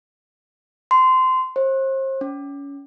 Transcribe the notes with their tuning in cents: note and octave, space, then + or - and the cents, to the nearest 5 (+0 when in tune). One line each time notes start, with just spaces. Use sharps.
C6 -20
C5 +35
C#4 +25